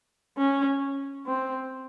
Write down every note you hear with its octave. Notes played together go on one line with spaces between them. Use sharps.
C#4
C4